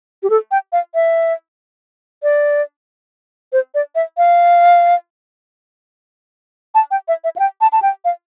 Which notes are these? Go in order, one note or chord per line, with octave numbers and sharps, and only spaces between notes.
G4
A4
G5
F5
E5
D5
C5
D5
E5
F5
A5
G5
E5
E5
F5
G5
A5
A5
G5
F5